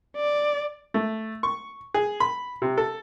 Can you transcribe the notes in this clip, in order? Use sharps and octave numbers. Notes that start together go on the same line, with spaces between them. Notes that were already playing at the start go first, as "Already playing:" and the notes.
D5
A3
C#6
G#4
B5
C3
A4